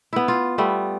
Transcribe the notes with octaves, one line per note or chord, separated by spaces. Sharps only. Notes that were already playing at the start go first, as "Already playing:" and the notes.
B3 E4
F4
G3 A3 B3